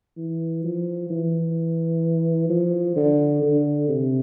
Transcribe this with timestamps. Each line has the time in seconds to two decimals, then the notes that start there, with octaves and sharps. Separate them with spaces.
0.17 E3
0.64 F3
1.10 E3
2.49 F3
2.96 D3
3.42 D3
3.89 C3